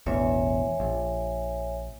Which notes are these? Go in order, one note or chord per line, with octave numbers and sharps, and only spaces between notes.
E1 A1 E2 C#5 E5 G#5
A#1